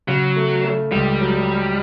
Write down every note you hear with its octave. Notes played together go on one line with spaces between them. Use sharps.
C#3 F#3
A3
A3
C#2 G3
F#3